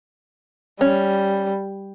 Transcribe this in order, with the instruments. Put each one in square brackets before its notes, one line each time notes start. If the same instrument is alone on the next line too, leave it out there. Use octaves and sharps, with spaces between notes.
[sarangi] G3 [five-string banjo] C#4